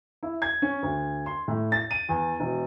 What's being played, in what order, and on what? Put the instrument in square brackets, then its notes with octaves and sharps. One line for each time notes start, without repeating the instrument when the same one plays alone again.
[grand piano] E4
G#6
C#4
D2
C6
A2
A6
D#7
E2
E1